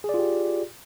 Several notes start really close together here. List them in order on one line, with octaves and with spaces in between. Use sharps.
G#4 D5 F4 G4